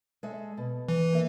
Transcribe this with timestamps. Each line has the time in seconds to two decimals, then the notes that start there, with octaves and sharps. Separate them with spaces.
0.23 G#3 A4 E5
0.57 B2
0.89 E3
1.12 A#3 E5